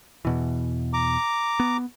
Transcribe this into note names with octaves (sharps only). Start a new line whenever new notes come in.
E2 B2 E3
A#5 D6
B3